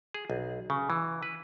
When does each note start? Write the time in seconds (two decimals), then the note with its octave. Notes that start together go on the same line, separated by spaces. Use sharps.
0.14 G#4
0.30 B1
0.70 C#3
0.90 E3
1.23 B4